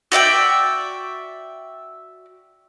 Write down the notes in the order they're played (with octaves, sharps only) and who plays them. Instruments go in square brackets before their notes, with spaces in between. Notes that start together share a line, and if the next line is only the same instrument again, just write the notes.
[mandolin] F#4 D5 E5 G5